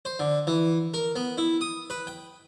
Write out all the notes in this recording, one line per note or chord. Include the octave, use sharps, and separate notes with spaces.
C5
D3
E3
A#4
B3
E4
D#6
B4
G5